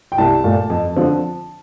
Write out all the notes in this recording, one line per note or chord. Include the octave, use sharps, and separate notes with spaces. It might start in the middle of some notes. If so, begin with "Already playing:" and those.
G5
C2 A5
A#2 A3
F2
D3 F3 C4